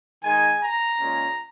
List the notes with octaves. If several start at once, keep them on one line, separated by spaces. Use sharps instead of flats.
D#3 G#3 D#4 G#5
A#5
A#2 G#3 C#4